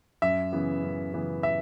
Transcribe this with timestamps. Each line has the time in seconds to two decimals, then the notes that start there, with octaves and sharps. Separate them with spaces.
0.22 F#2 E5
0.52 C#3 E3 B3
0.83 F#2
1.13 C#3 E3 B3
1.43 E5